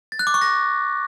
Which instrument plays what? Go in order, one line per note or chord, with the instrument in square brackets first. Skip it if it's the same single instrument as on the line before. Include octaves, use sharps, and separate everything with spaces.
[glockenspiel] A6
F#6
D6
C#6
A#6